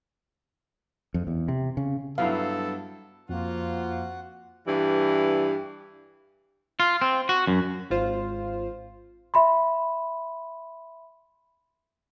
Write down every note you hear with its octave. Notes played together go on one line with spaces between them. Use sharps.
F2
E2
C3
C#3
G2 F#3 B3 E4 A4 F5
F2 F3 A#3 F4 F#4 F#5
G2 E3 G3
F4
C4
F#4
F#2
G#1 F4 C5
E5 B5 C6